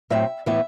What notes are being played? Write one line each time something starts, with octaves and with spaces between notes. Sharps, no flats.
A2 F#3 C4 E5
A2 E3 B3 E4 E5